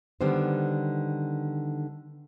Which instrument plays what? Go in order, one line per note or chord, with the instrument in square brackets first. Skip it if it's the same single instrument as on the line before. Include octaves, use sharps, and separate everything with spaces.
[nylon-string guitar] D3 D#3 G3 B3 C5